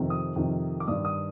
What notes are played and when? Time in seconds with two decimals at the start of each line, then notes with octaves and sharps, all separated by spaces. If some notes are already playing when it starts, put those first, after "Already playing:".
Already playing: F2 C3 D#3
0.10 D#6
0.36 F2 C3 D#3
0.80 D6
0.88 G2 D#3 D#6
1.05 D#6